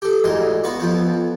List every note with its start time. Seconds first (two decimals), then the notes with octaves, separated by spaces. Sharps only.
0.02 G4 A4
0.24 D2 G#2 E3 D#5 C6
0.64 B3 F4 F#4 B4
0.80 F2 F3 B3